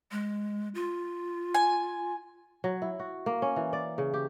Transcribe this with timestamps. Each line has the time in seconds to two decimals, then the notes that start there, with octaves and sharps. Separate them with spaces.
0.12 G#3
0.75 F4
1.54 G#5
2.64 F#3
2.82 E4
2.99 F#4
3.26 A#3
3.42 C#4
3.56 E3
3.73 D5
3.98 C#3
4.14 G4